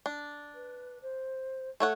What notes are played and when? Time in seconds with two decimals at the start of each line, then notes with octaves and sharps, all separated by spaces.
0.06 D4
0.55 B4
1.02 C5
1.80 A3 A4 C#5 F#5